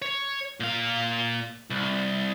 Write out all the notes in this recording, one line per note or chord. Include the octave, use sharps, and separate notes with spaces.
C#5
A#2 F5
C2